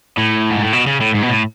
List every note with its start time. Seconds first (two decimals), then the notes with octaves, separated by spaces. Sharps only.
0.17 A2
0.51 G#2
0.62 A2
0.73 B2
0.87 C#3
1.01 A2
1.14 G#2
1.23 B2
1.29 A2